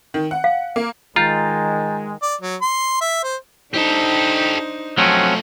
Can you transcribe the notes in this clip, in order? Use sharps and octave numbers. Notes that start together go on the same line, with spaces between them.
D#3
F#5
F5
A#3
D#3 G#3 F4 A#5 G6 A6
D5
F#3
C6
E5
C5
D4 D#4 G4 A4 C5
F3 F#3 A3 C4 C#4